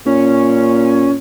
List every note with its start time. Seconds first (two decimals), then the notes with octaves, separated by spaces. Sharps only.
0.06 A#2 C#4